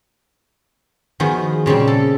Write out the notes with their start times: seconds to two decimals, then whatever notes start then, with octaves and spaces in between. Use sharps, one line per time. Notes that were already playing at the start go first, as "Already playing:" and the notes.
1.20 D#3 F3 B3 F#4 G#4
1.66 A#2 C#3 G3 C4
1.88 A4